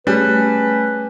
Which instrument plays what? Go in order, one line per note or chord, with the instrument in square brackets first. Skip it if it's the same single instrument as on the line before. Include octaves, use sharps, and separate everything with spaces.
[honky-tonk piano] G3 [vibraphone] A3 G#5 [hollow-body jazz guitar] C#4 G#4 [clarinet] B4